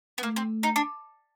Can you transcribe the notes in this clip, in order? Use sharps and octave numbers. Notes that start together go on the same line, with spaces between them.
B3
A3 A#3
C4
D#4
D4